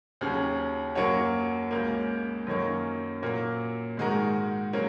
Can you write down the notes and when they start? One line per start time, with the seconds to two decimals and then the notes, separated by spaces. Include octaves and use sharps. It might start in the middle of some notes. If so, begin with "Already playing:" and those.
0.21 D#2 C#3 F#3 C#4
0.95 F#2 F#3 A#3 F#4 C#5
1.71 C#2 C#3 A#3
2.47 F#2 D#3 F#3 A#3 C#4
3.22 A#2 F#3 A#3
3.97 G#2 D#3 G#3 F#4 A#4
4.73 C#3 F#3 A#3